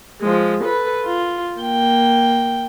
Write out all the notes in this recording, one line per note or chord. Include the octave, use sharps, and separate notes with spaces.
F3 G#3
A4 B4
F4
A#3 G5